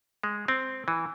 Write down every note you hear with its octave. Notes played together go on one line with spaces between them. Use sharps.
G#3
C4
E3